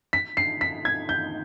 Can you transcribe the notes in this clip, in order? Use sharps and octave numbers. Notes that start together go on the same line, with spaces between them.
B6
C7
B6
G#6
G6